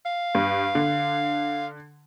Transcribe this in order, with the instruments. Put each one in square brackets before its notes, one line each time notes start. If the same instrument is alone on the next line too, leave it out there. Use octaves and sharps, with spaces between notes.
[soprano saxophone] F5
[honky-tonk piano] G2
D3